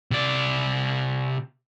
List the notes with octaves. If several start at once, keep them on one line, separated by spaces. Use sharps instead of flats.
C3 D5